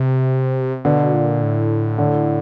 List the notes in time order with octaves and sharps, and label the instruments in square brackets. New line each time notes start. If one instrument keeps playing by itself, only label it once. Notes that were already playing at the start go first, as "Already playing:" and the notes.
Already playing: [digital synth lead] C3
[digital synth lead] B2 [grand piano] D3
[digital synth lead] A#2
A2
[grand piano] D3